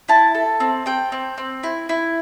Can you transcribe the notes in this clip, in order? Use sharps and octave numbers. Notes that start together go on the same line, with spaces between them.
E4 A5
A4
C4
C4 G5
C4
C4
E4
E4